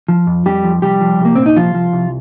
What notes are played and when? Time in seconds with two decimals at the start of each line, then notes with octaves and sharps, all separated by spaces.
0.09 F3
0.27 F2
0.46 F2 G3 G4
0.64 F3
0.82 C2 G3 G4
1.01 F3
1.19 C2
1.25 A#3
1.36 A#2 C4
1.46 D#4
1.56 C2 F3 F4
1.75 F3
1.93 C2